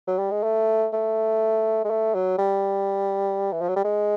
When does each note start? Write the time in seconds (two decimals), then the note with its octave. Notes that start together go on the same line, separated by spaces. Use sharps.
0.07 F#3
0.19 G3
0.31 G#3
0.43 A3
0.93 A3
1.85 G#3
1.90 A3
2.15 F#3
2.38 G3
3.52 E3
3.61 F3
3.69 F#3
3.76 G3
3.85 G#3